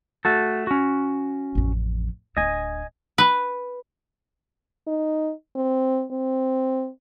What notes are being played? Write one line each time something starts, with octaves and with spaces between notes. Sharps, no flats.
A3 F#4 A4
C#4 F#4
A1 F2
D1 D4 D#5 G#5
B4
D#4
C4
C4